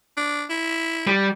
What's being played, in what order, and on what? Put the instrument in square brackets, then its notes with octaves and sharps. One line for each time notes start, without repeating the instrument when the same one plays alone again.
[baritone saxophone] D4
E4
[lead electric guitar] G3